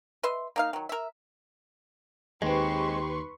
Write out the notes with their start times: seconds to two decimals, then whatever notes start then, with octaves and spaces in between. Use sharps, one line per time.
0.23 B4 D#5 E5 C6
0.56 A#3 D#4 F5
0.73 D#3 F#3
0.89 A#4 E5
2.42 D#2 G#3 C4 G4 B4 C6 C#6